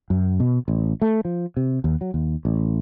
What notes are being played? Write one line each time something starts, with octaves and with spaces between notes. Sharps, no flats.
F#2
B2
A1
A3
F3
C3
D#2
F#3
D#2
A1